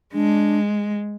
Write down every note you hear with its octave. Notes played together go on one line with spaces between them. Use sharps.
G#3 D4